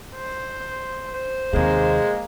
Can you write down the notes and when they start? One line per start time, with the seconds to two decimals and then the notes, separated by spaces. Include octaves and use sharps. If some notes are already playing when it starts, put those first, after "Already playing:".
0.15 C5
1.14 C5
1.53 D#2 C3 G#3 A#3